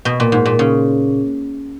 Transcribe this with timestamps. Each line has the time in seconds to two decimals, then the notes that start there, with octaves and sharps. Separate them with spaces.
0.05 B2
0.20 A#2
0.32 G#2
0.46 A#2
0.59 C#3